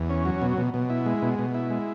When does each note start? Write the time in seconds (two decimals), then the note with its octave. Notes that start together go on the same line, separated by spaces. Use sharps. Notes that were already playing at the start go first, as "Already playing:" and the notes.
Already playing: E2
0.10 C#4
0.25 F#3
0.42 B2
0.58 B2
0.74 B2
0.90 E4
1.06 G#3
1.22 B2
1.39 B2
1.54 E4
1.70 G#3